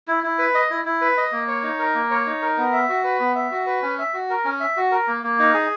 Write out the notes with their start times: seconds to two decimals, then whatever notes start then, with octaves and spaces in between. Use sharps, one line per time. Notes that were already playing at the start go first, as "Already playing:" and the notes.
0.08 E4
0.24 E4
0.39 B4
0.55 D#5
0.71 E4
0.85 E4
1.02 B4
1.18 D#5
1.32 A#3
1.48 C#5
1.63 D#4
1.79 A#4
1.94 A#3
2.11 C#5
2.26 D#4
2.42 A#4
2.57 B3
2.73 E5
2.89 F#4
3.04 B4
3.20 B3
3.35 E5
3.51 F#4
3.66 B4
3.82 C#4
3.99 E5
4.14 F#4
4.30 A#4
4.45 C#4
4.60 E5
4.77 F#4
4.92 A#4
5.08 A#3
5.23 A#3
5.39 D#4
5.54 G#4